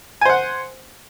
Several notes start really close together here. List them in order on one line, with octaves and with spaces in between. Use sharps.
G#5 C5 F#5